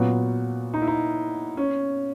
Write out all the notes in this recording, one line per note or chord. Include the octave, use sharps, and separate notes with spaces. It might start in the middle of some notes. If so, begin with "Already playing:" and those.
Already playing: A#2 F#3 B3 F#4
D#4
E4
D#4
C#4